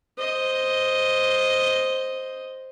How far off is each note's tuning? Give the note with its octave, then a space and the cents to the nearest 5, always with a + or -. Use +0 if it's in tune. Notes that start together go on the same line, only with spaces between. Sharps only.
C5 +0 D#5 +0